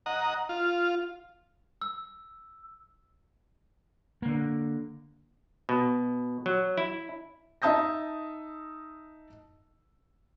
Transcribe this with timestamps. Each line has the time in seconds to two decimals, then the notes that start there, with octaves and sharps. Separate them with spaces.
0.06 D#5 F#5 A#5
0.49 F4
1.82 E6
4.22 D3 A#3
5.69 B2
6.46 F#3
6.78 E4
7.62 D#4 E5 A5 D#6 G6 A#6